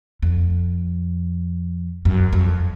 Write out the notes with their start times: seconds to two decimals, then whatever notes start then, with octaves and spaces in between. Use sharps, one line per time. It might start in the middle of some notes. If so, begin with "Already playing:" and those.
0.22 F2
2.05 F#2
2.33 F2